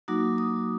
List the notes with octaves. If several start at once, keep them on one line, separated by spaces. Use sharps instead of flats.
F#3 A#3 D#4 F#4 D6
D#6